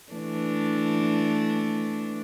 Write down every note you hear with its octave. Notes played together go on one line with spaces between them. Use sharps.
E3 A3 D4